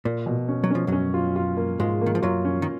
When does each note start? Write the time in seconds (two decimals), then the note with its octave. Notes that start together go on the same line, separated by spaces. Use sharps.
0.05 A#2 A#3
0.26 B2
0.48 C#4
0.64 F#3
0.71 F3 C#4
0.87 F#2 F#3 C#4
1.14 F4
1.36 F4
1.57 A#3
1.80 G#2 G#3 F4
2.01 A#3
2.06 D#3
2.15 F3
2.22 F#2 F#3 F4
2.45 C#4
2.62 D#3